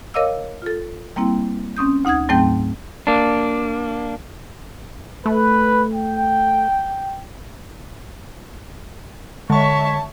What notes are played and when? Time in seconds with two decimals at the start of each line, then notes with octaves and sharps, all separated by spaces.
0.14 A#4 C#5 D#5 F5 D6 E6
0.62 F4 A4
1.16 G3 A#3 C4 E4 G5
1.77 C4 C#4 D#6 G6
2.05 D2 D#4 F#5 D#6 G#6
2.29 G#2 F#3 A3 C4 G5 G6
3.07 A#3 D4
5.26 A3 B4
5.94 G5
9.50 D3 G#3 C#5 E5 A5 C#6